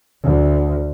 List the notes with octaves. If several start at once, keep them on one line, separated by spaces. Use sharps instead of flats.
D2